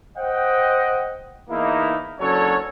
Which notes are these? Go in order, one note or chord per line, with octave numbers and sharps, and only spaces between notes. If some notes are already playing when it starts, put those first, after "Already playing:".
C5 D#5 F#5 G5
E2 A#3 D#4 E4
F#1 D3 F#3 C#4 A4 C#5